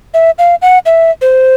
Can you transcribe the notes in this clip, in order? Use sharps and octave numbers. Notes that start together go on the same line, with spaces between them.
E5
F5
F#5
E5
C5